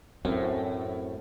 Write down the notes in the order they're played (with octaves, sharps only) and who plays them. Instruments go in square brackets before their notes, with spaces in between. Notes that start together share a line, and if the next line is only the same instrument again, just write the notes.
[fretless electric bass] F#2 A2 [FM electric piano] C4